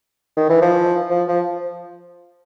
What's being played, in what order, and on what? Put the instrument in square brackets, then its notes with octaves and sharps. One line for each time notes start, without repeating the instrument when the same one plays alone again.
[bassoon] D#3
E3
F3
F3
F3